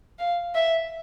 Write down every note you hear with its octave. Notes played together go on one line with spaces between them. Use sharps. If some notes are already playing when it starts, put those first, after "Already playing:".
F5
E5